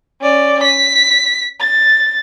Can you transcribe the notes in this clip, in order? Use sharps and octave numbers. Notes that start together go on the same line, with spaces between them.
C#4 D5
B6
A6